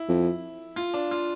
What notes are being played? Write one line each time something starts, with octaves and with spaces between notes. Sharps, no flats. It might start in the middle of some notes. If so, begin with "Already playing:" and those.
Already playing: E4
F2
F4
D4
F4